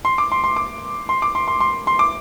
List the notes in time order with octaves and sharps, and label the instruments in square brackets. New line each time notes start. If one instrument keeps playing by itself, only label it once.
[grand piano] C6
D6
C6
C6
D6
C6
D6
C6
C6
C6
C6
D6